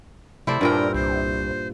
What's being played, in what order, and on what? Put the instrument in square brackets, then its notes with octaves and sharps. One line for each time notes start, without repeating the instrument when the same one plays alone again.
[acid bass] C3 [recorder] A3 [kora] E4 C5 D5
[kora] G2 A#2 G5 [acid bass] D4 [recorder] A#4
[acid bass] C2 [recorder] C5